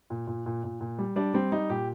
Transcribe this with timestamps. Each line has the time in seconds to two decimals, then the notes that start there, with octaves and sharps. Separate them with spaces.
0.10 A#2
0.27 A#2
0.46 A#2
0.64 A#2
0.81 A#2
0.98 G3
1.16 G3 D4
1.34 G3 C4
1.52 G3 D#4
1.69 A#2 G4